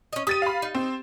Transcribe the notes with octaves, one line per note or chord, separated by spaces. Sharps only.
C#4 D#5
G4 D#6 A6 D#7
F5 B5
D#4
C4